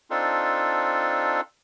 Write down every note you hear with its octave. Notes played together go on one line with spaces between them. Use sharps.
C4 D4 D#4 F4 A4